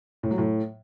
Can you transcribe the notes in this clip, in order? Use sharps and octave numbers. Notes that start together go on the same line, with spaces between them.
A2
F#3
A2